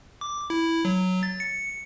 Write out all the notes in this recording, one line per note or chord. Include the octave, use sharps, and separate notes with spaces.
D6
E4
F#3
A6
C#7